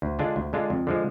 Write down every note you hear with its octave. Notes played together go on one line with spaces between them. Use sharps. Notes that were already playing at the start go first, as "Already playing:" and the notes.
D2
D3 G#3 D4 F4
D2
D3 G#3 D4 F4
F2
D3 F3 G#3